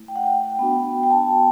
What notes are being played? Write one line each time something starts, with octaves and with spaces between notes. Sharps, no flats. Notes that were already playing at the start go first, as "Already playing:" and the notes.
Already playing: A3 E4
G5
F#5
G5
B3 D4 F#4
G5
A5